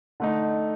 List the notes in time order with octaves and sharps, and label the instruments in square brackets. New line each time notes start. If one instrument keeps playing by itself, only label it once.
[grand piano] D3 A3 D#4